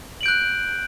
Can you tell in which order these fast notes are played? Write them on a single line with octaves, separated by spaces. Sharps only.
F#7 D7 G6 F#6